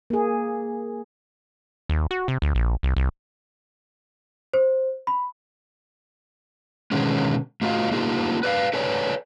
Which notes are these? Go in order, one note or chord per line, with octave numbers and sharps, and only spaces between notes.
A#3 G#4
D#2
F#4
C3
D2
A#1
C2
C2
C5
B5
B2 D3 D#3 G#3 C#4
A3 F4 F#4 D#5 F5
A#3 D4 D#4 F4 G4 A4
B4 D5 F5
A4 B4 C#5 D5 G#5